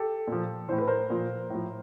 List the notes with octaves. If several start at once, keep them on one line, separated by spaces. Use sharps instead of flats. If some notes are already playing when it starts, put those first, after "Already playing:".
Already playing: G4 A4
A#2 F3
A2 E3 C5
B4
A#4 C5
A#2 F3
A2 F3